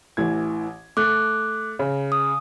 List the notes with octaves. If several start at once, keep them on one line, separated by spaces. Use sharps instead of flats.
A1 E3 G#6
A3 D6 F#6
C#3
D#6